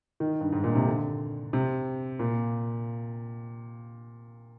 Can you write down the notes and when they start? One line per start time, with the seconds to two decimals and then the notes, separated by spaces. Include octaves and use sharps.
0.20 D#3
0.41 G2
0.52 G#2
0.64 A#2
0.75 C3
0.87 D3
1.53 C3
2.19 A#2